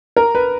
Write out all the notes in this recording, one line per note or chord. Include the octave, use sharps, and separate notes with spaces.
A#4
B4